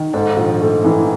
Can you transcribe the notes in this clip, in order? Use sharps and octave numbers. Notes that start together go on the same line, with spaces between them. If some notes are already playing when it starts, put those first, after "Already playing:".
Already playing: D#3
G#2 A4
A#1
A3
E3